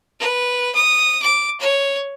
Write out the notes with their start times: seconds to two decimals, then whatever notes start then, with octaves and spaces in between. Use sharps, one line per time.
0.20 B4
0.75 D#6
1.22 D6
1.60 C#5